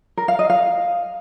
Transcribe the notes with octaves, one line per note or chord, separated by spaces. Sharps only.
A#4
F5
D#5
F5